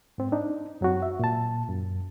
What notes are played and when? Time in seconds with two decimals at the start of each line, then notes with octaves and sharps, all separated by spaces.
0.18 G#2 C4
0.32 D4 D#4
0.81 F#2 F#3 C4 F#4
1.02 E5
1.20 A#2 A5
1.69 F#2